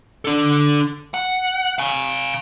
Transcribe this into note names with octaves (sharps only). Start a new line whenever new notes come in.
D4 A4
F#5
F5 G#5